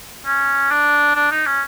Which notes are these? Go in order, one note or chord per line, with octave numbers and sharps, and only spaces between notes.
C#4
D4
D4
D#4
C#4